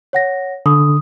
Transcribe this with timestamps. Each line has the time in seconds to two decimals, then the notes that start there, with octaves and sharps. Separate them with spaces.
0.13 C#5 F#5 A#6
0.66 D3 D#6